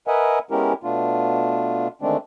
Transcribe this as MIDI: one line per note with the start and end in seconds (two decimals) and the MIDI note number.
0.08 0.39 70
0.08 0.39 71
0.08 0.39 75
0.08 0.39 76
0.08 0.39 78
0.08 0.39 80
0.51 0.73 56
0.51 0.73 59
0.51 0.73 61
0.51 0.73 64
0.51 0.73 67
0.51 0.73 70
0.83 1.88 47
0.83 1.88 57
0.83 1.88 59
0.83 1.88 62
0.83 1.88 65
2.02 2.17 50
2.02 2.17 51
2.02 2.17 56
2.02 2.17 57
2.02 2.17 60
2.02 2.17 62